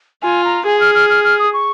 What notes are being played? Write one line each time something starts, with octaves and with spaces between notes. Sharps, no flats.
F4 G#5
A#5
G#4 G#5
F6
F6
F6
F6
D#6
C#6